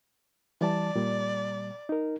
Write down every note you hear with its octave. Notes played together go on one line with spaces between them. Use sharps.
E3 G3 D5 A5
A#2 G3
D#4 A#4